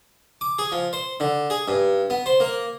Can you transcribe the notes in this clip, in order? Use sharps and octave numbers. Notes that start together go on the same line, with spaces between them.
D6
G#4
F3
C5
D3
G#4
G2
B3
C5
A#3